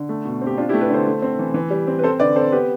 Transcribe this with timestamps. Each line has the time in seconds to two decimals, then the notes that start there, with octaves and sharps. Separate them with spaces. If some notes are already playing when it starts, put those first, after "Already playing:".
Already playing: D3
0.09 A3
0.25 B2
0.42 C4
0.47 G4
0.57 D4 F4
0.69 E4 G4
0.73 A3
0.81 G4 B4
0.89 D3 A4 C5
1.07 A3
1.22 C4
1.39 E3
1.54 E3
1.70 G3
1.87 C4
1.99 B4
2.03 C4 A4 C5
2.19 D3 B4 D5
2.36 C4 A4 C5
2.52 B3 G4 B4